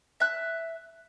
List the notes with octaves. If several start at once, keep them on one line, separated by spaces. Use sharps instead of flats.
E5 F#6